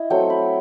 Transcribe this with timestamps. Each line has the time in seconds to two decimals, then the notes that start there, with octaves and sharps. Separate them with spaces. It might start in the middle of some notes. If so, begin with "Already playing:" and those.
Already playing: E4 D#5
0.10 F#3 A3 C4 G5
0.30 B5